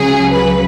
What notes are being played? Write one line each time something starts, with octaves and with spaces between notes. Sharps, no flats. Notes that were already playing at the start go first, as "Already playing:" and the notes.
Already playing: C#2 C#3 F#3 G#4
B4